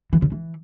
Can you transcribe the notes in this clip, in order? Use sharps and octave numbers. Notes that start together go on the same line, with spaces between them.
E3
C#3
E3